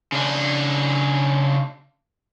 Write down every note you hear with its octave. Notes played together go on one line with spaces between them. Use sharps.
C#3 D4